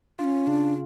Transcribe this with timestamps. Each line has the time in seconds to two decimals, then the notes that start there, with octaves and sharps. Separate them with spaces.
0.19 D4 F4
0.24 C#4
0.47 C#3 D4